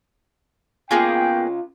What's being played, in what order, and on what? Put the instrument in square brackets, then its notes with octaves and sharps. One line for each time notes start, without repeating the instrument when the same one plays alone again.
[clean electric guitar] C#3 F4 [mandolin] A#3 B3 G#4 [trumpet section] G5